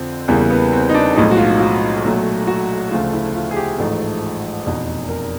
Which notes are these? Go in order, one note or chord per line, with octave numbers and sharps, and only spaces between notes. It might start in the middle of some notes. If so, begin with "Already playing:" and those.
Already playing: F2 D3 F3 C4
E2 C#3 E3 G3 A#3
B3
C4
D#4
D4
B1 A2 F3 G#3 D#4
F#4
F4
F#4
B1 A#2 F#3 A3
F#4
D2 C#3 F3 A3 F4
E4
F4
G#4
G4
A1 G#2 F3 A3 A4
F1 E2 B2
A#4